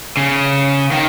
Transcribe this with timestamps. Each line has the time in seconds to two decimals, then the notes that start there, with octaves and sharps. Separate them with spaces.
0.17 C#3
0.92 D#3